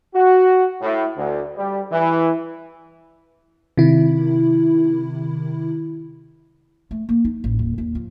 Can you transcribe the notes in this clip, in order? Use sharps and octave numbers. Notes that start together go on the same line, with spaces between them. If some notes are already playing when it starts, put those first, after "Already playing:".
F#4
A2
D2
G3
E3
C3 D#3 E4
A3
A#3
D#4
A1
D#1
D#2
F3